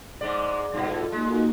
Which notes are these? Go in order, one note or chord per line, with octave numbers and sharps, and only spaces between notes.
G#2 G#3 D5
G2 B2 F4 A4
G#3 A#3 D#4 F#4